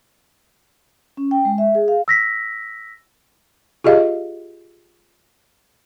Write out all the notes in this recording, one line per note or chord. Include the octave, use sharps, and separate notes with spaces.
C#4
G5
G#3
E5
G#4
F5
E6 A#6 B6
F4 G4 G#4 D#5 F5